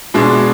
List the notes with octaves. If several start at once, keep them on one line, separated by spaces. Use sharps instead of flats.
B2 G#3 D4 G#4